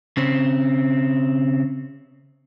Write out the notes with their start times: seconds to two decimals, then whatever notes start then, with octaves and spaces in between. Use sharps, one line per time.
0.17 C#3 C4